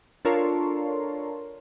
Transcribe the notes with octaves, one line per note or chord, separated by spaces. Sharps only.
D4 F4 A4 A#4 C#5 C6